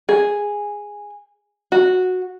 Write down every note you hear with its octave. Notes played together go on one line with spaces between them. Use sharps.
G#4
F#4